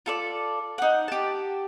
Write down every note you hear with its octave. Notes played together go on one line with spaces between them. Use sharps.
F4 A4 D5
D#4 F#5
G4 A5